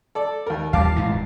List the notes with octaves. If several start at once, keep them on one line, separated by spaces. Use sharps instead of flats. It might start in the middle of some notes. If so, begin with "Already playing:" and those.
A4 D5
D#2 A#4
D#2 G3 F5 A5 D6
D#1 G#2 E3